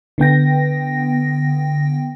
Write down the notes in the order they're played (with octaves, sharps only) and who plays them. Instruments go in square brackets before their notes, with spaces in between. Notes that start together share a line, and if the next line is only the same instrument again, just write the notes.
[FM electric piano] D3 B3 G5 A#6